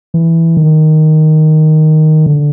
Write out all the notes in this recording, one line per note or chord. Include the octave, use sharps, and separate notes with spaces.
E3
D#3
D3